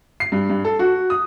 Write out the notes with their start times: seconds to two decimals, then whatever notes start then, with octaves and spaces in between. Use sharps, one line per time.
0.20 C7
0.32 G2
0.50 G2
0.65 A4
0.79 F#4
1.10 D#6